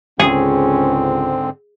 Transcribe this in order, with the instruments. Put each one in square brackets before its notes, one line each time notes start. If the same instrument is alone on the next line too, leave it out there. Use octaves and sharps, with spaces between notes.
[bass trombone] C#2 [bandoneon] G#2 D3 C4 [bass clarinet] C#4 [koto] G#4